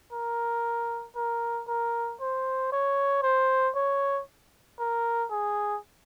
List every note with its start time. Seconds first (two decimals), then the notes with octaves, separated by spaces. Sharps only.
0.12 A#4
1.16 A#4
1.68 A#4
2.20 C5
2.72 C#5
3.23 C5
3.75 C#5
4.79 A#4
5.31 G#4